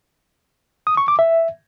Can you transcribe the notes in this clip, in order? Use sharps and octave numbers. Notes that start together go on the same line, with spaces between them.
D#6
C#6
D6
E5